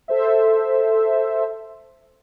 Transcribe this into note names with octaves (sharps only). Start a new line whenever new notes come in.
A4 C5 E5